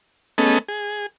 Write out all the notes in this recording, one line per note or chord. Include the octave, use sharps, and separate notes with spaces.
A3 B3 C#4 G#4 A4 D#5
G#4